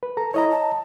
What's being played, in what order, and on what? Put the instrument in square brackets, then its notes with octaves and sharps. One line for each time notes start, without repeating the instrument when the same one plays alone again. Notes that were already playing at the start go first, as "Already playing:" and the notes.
[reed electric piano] B4
A4 A#5
[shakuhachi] E4 [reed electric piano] C#5 D#5 A#5
[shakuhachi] A5